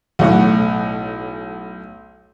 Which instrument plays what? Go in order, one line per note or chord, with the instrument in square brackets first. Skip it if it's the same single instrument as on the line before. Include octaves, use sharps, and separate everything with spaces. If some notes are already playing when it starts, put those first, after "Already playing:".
[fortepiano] B1 A2 F#5